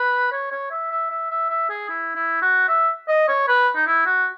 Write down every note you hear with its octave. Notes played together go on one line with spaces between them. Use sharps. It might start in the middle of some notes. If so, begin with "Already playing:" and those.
Already playing: B4
C#5
C#5
E5
E5
E5
E5
E5
G#4
E4
E4
F#4
E5
D#5
C#5
B4
D#4
E4
F#4